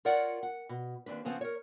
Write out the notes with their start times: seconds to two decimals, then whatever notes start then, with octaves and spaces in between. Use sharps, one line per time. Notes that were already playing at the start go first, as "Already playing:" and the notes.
0.05 F4 A#4 C#5 D5 F#5
0.43 F#5
0.69 B2
1.06 D#2 G#2 C4 D4 B4
1.25 C#3 F3 B3 C4
1.41 A#4 C#5